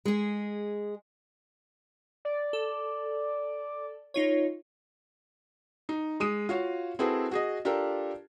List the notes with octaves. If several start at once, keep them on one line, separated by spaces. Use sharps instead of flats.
G#3 G#4
D5
A4
D#4 F4 C#5
D#4
G#3 D#6 D#7
F4 F#4 C#5 F5
C4 E4 F#4 G#4 A4 B4
F#4 G#4 D#5
D4 F4 G4 A4 A#4